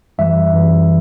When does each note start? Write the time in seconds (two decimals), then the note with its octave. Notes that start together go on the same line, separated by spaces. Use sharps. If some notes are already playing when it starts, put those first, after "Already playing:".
0.18 F#2 E3 G3 E5
0.53 F#2 E3 G3